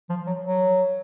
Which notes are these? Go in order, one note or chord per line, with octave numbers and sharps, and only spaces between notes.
F3
F#3
F#3